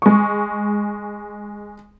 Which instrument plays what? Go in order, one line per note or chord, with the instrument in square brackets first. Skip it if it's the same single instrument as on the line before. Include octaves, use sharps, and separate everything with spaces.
[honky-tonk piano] G#3 C#6